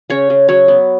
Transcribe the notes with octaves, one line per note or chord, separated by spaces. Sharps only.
C#3 C#5
C#3
F#3 C#5
B3